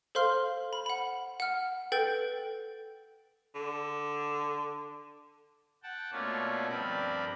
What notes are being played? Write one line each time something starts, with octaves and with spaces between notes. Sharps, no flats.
A4 C5 F5 C6 F6
B5
F#5 B5
F#5 F6
A4 B4 G5 G6 A6 D7
D3
F#5 G5 A5
B2 A3 A#3 C#4 F4 D5
G2 F3 C4 A#4 D5 B5